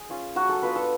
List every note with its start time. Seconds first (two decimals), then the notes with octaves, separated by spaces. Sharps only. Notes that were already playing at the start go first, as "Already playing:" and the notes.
Already playing: G#4
0.10 C#4 F4
0.36 F#3 F#4
0.49 A4
0.62 B3 D4 F4 B4
0.76 A4